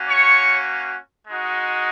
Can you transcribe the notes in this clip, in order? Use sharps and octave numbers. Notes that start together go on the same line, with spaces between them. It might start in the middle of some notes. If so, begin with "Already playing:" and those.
Already playing: A#3 C#4 F#4
C#5 C#6
G#3 D#4 F#4